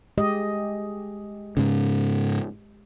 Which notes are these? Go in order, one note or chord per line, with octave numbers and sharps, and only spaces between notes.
G#3 G4 D#5
G#2 C#3